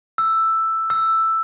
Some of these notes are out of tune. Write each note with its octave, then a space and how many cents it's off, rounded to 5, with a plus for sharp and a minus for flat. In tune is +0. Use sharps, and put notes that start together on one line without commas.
E6 +5
E6 +5